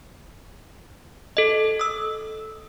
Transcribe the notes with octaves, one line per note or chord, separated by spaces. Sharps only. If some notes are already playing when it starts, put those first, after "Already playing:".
A4 D#5
D#6 E6